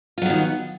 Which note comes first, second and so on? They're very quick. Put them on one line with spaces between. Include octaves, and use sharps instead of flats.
F4 F#3 B3 D#3